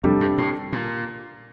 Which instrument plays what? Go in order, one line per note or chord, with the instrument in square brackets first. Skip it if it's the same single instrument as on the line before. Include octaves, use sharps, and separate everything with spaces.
[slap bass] F2 [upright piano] C3 G3 D4 A4
[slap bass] G2
A2
A#2